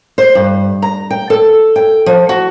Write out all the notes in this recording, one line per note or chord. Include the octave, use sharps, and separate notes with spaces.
C5
G2
A#5
G5
A4
G5
F3
F#4